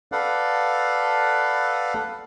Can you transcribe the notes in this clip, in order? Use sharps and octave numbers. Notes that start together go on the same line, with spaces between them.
A4 B4 D5 F5 F#5